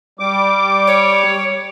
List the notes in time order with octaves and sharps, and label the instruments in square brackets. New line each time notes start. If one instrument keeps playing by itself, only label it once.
[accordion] G3 D6
[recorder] C#5